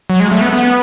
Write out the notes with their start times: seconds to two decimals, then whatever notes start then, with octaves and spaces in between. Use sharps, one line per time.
0.10 F#3
0.20 G#3
0.31 A3
0.41 B3
0.53 B3